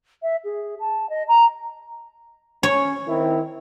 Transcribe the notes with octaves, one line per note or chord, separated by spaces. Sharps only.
E5
G#4
A5
D#5
A#5
C#4 C#5
D#3 C4 E4